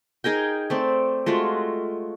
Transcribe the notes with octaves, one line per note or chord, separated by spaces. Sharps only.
D#4 G#4 A#4 G5
A3 C4 D5
G#3 A3 F4 F#4